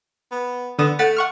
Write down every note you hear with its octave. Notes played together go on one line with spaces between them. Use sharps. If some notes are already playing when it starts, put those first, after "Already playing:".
B3
D3 B3 D#6 E7
A3 F#5 A6 B6
F#5 C#6 F6